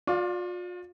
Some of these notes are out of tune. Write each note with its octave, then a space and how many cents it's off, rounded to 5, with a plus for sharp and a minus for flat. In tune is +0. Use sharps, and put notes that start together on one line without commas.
F4 +40 D5 +0 F5 +0